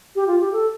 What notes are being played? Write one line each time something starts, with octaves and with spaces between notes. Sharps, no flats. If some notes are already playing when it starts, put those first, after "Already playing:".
G4
F4
G4
A4